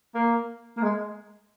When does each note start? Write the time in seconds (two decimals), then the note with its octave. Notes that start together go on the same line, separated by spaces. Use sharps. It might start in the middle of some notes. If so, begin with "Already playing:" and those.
0.14 A#3
0.77 A#3
0.82 G#3